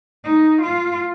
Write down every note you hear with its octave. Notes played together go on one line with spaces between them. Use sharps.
D#4
F4